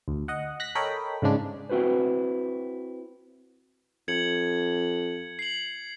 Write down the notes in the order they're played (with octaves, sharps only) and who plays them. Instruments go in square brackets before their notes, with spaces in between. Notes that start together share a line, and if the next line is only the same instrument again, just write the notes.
[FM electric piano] D2
D#5 F#5
F#6 A#6 B6
A4 A#4 C#5 D#5 G5 B5
G#2 C#3 G#3 D4
[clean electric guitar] C4 E4 F#4 B4 C5
[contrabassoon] F2 [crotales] G#6 C#7 F#7
[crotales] C7 F#7